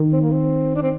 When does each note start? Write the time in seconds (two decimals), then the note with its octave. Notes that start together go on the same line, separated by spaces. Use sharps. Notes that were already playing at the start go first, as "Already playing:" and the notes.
Already playing: D#3
0.13 C4
0.21 A#3
0.31 C4
0.75 D4
0.82 C4